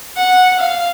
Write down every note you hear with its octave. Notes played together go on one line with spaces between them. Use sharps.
F#5
F5